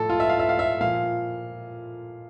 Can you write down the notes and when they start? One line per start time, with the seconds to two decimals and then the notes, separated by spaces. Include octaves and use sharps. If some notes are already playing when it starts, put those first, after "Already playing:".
Already playing: A2 F3 A4
0.10 F4
0.20 E5
0.29 F5
0.39 E5
0.49 F5
0.59 E5
0.80 A#2 F3 F5